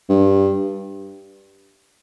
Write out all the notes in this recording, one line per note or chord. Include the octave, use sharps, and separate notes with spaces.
G2